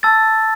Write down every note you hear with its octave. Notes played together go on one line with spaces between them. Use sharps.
A5 E6 A6